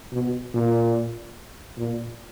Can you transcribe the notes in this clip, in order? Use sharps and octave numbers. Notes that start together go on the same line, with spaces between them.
B2
A#2
A#2